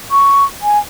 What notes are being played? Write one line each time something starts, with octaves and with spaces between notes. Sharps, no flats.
C#6
G#5